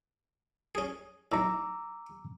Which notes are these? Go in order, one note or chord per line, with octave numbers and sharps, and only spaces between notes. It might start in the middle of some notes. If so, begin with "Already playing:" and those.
C#4 G#4
B1 A2 A#5 D6 E6